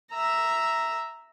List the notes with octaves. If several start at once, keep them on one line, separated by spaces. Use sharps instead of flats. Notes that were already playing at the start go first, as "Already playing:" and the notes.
E5 A#5